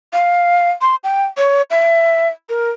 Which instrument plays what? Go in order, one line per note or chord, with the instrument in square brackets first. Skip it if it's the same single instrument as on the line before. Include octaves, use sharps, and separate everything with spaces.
[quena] F5
C6
G5
C#5
E5
A#4